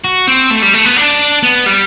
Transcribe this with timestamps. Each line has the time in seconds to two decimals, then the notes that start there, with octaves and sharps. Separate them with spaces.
0.04 F#4
0.27 C4
0.50 A3
0.62 G3
0.74 A3
0.85 B3
0.97 D4
1.43 B3
1.66 G3